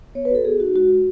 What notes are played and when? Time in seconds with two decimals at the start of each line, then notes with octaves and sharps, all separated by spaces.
0.15 B3 C#5
0.25 B4
0.30 F#4 A4
0.45 B3 G#4
0.60 D#4 F#4
0.75 G#3 F#4
0.91 F#4